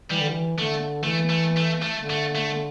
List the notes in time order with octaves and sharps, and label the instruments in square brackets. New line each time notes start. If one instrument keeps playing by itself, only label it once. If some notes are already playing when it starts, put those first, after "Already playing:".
[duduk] E3 [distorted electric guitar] G3
[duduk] D3
E3
[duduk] D3 [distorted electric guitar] A3
[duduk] E3 [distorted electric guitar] A3
[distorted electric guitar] A3
A3
A3
[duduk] D3
[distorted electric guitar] A3
A3